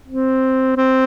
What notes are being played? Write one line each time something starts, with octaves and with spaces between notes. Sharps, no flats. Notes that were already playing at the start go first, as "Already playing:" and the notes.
C4
C4